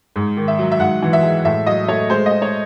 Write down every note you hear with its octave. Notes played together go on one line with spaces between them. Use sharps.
G#2
D#3
E5
F#3
E5
G#2 F#5
E3
E5
G#3
A2 E5
F#3 D#5
A3 C#5
G#3 C5
D#5
G#3
C#5